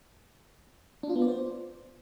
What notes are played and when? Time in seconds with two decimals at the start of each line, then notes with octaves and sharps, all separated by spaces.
1.03 D4
1.09 F4
1.16 B3
1.22 D5
1.28 C5